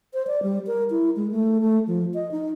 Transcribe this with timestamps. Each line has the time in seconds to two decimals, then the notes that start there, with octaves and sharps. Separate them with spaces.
0.14 C5
0.27 D5
0.43 G3
0.67 A#4
0.90 E4
1.16 G#3
1.31 A3
1.61 A3
1.87 F3
2.14 D#5
2.31 D#4